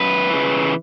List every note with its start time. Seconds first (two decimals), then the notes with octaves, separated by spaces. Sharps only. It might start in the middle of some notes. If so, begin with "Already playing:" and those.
Already playing: F#2 B4
0.30 C#3 E3